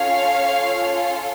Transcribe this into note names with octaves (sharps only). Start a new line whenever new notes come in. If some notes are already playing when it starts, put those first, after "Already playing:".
Already playing: C#4 F4 A4 C#5 F5
C#4 F4 A4